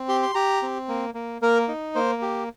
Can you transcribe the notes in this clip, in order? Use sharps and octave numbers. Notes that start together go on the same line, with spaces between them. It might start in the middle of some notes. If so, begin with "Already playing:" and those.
Already playing: C4
G4 C6
C6
G4 A#5
C4
A#3
A#3
A#3 A#4
D#4
A#3 C5
G4